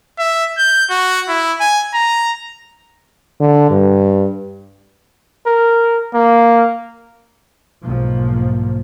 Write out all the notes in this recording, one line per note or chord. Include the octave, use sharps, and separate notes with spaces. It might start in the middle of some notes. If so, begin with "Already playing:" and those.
E5
G6
F#4
E4
G#5
A#5
D3
G2
A#4
A#3
B1 G#2 F3 A#3